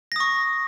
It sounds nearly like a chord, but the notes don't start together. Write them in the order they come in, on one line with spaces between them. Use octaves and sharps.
A#6 D#6 C#6